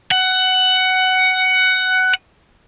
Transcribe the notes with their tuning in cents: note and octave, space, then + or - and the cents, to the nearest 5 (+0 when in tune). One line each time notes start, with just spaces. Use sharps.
F#5 +15